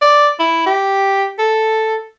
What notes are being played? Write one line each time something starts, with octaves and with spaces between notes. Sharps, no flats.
D5
E4
G4
A4